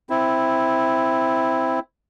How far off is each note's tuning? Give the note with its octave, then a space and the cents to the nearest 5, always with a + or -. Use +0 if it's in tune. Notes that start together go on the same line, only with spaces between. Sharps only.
C4 +0 E4 +0